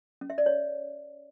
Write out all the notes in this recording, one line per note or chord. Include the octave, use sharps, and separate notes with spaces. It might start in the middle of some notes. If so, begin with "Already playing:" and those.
C#4
E5
D5
C#5